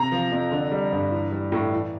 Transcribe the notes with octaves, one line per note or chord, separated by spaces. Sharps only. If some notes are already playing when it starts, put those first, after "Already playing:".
Already playing: C3 A#5
F3
F2
D3
G3
G2
E3
G3
A2
E3